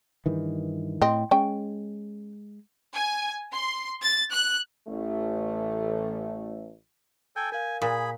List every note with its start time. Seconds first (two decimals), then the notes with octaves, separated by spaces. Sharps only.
0.26 G2 D#3 E3
1.02 A2 C4 D#5
1.31 G#3 C#4 G5
2.94 G#5
3.52 C6
4.02 A6
4.31 F#6
4.88 A1 A3
7.36 A4 G5 G#5 G6
7.52 A#4 F5 G#5
7.82 A#2 G#4 B5